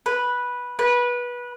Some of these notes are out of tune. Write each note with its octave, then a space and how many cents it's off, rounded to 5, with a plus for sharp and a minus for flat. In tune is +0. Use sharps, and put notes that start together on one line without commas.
B4 -10
B4 -20